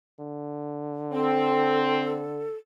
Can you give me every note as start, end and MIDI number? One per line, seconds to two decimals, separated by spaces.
0.20 2.47 50
1.13 2.23 60
1.13 2.56 69